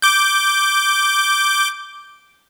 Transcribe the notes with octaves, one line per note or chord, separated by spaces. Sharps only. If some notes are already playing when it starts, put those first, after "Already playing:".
D6 G6